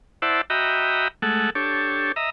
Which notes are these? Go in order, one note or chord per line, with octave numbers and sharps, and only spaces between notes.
E4 C5 D5 E5 F#5 A5
F#4 D#5 E5 G5 A#5 B5
G#3 A3 A4 F#5
D4 G4 A4 C#5
D#5 E5 A#5